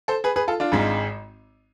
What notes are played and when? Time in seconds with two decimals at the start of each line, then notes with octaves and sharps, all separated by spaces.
0.08 A4 C5
0.24 G#4 B4
0.36 G#4 B4
0.48 F4 A4
0.60 D4 F4
0.72 G#1 G#2 G#3